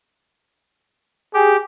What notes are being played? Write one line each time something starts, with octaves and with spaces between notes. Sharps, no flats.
G4 G#4